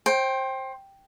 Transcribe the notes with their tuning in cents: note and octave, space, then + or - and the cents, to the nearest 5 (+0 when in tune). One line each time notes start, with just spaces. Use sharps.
C5 +25 G5 +0